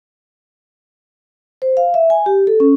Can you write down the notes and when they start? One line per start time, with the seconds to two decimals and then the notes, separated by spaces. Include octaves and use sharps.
1.62 C5
1.77 F5
1.94 E5
2.10 G#5
2.26 G4
2.47 A4
2.60 C#4